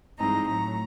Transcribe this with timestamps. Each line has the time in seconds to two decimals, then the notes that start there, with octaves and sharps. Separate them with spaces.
0.18 G2 E3 G#3 C4 D#4 A#5
0.47 A2 F#3 A3 A#5